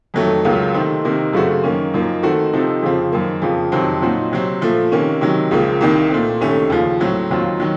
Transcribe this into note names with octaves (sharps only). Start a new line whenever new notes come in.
F2 D#3 F#3 A3
C#2 C#3 F#3 A#3 F4
C3 D#3 A3 C4
C3 D#3 A#3 D#4
F#2 C#3 A3 C4 F#4
F#2 D#3 A#3 C#4
F#2 F3 A#3 D#4
D#3 A3 C4 F#4 A4
C3 F3 C4 D#4 A4
F2 C#3 F3 C4
F#2 D#3 A#3
F2 C#3 F3
F2 C3 D#3 F#3 C4
A#2 F#3 C4 D#4 F#4
C3 F#3 C4
A#2 F3 A3
C3 D#3 A#3 C#4
C3 D#3 F#3
C#2 C#3 F3 A#3
C2 C3 D#3 A#3 D#4
A#2 A3 C4
C2 C3 D#3 A3 C#4
D#2 C#3 F3
A2 F#3 C4
D#2 D#3 F#3 C4 F4
D#3 F#3